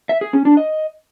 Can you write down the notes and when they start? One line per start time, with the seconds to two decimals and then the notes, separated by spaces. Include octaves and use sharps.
0.09 E5
0.21 G#4
0.33 C#4
0.45 D4
0.57 D#5